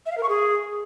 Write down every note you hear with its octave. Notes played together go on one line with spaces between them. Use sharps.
E5
F5
A#4
C#6
G#4